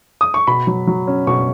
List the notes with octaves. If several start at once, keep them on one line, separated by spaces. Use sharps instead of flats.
D#6
C#6
B2 B5
F#3
F#3
C#4
B2 C#6